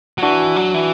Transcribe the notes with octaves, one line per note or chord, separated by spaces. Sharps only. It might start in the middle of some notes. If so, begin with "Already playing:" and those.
F#3
E3 D4 F#4
F#3
E3